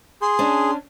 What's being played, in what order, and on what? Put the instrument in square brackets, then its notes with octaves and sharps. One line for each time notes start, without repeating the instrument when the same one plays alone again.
[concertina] G#4 [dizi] C6
[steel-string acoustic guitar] C#4 D4